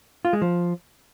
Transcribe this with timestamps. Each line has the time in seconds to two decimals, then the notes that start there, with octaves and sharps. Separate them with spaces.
0.25 F4
0.33 G#3
0.42 F3